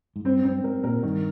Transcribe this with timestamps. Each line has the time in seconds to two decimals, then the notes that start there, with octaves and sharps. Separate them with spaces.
0.16 G#2
0.25 G2 C4
0.45 G2 C4
0.64 G#2 A#4
0.84 A#2 A#4
1.03 G2 D#3